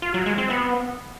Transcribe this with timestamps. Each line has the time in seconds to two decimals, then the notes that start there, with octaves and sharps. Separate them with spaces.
0.02 F4
0.14 F#3
0.26 G#3
0.38 C4
0.50 B3